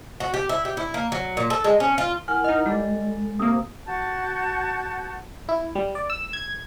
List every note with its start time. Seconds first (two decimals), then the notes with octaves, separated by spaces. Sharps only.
0.20 F#4
0.34 G4
0.49 E4
0.65 G4
0.77 E4
0.94 A#3
1.12 F#3
1.37 A#2
1.50 A4
1.64 G#3
1.80 C#4
1.98 F4
2.28 E4 A#4 F#5 G#5 F6
2.44 D#4 D#5 F6
2.66 G3 G#3 A4
3.39 C3 A#3 D#6 E6
3.85 F#4 A5 G6
5.49 E4
5.75 G3
5.95 D5
6.10 E6
6.33 G#6